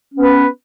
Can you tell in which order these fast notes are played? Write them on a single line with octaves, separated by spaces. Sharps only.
C#4 B3 B4